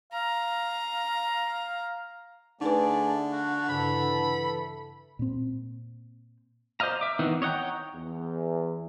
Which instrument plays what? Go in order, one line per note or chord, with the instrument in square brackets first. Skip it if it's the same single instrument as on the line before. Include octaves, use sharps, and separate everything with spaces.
[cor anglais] F5 [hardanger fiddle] A#5
[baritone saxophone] D3 [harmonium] A3 G#4 D5 [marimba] D#4 B4
[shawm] F#4 [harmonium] F5
[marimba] G2 C#3 [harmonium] E3 A4 [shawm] B5
[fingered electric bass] A#2 C4
[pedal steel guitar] C5 D5 D#5 F5 A#5
E5 D6
D#3 E3 B3 C4 D#4
C#5 D#5 F#5 G5 A#5
[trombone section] E2